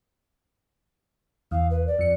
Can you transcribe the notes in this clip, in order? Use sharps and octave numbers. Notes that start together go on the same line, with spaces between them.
E2 F5
B4
D5
F2 C#7